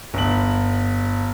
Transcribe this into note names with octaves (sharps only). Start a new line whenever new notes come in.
G1 F#7